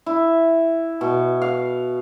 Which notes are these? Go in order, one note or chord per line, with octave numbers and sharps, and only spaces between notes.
E4
B2
F5